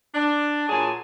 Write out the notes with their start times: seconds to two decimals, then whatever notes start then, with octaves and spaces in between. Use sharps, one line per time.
0.15 D4
0.69 A#2 F#3 G#4 G#5 A5